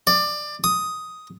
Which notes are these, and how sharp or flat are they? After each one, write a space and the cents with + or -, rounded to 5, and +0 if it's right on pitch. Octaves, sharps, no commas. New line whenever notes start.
D5 +20
D#6 +5